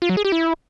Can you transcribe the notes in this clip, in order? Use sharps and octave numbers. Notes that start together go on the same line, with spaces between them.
F4
F#3
G#4
G4
E4